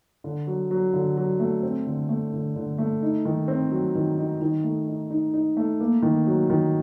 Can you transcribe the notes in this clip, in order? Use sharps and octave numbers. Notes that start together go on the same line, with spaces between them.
D3
F#3
F#3
D3
F#3
A3
C4
D3
A3
D3
D3
A3
D#4
D#3
C4
F#3
D#3
D#4
D#3
A3
D#4
D#4
D#4
A3
A#3
D#3
F#3
D#3